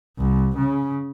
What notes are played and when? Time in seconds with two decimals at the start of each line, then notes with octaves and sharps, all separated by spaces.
0.19 C2
0.57 C#3